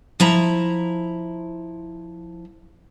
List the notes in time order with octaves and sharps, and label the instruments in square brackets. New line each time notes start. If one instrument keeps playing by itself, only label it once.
[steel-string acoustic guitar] F3 E4 A#5